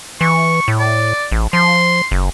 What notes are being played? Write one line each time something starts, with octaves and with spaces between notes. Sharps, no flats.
E3 C#6
A2
D5
A1
F3 C6
F#1